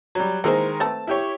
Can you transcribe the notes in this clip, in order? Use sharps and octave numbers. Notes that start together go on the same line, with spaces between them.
F#3 G3
D#3 E3 G#3 A#3 A#4 C5
A3 C4 B4 A5
E4 G4 C#5